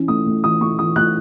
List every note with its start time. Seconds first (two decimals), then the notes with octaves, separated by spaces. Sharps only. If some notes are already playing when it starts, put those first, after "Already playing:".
Already playing: E3 C#4
0.08 A3 D#6
0.26 A3
0.44 E3 D#6
0.61 A3 C#6
0.79 E3 D#6
0.96 A3 F#6